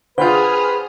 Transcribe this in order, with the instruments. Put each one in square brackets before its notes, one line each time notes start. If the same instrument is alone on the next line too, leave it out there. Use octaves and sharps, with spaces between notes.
[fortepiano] D3 F4 [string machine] G#4 D#6 F6 [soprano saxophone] B4 [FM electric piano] C5 G5